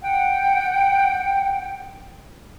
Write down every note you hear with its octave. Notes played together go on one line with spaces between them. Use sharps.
F#5 G5